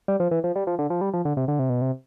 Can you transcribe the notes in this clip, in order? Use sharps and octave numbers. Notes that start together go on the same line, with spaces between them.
G3
F3
E3
F3
G3
F3
D3
F3
G3
F3
D3
C3
D3
C3
B2
C3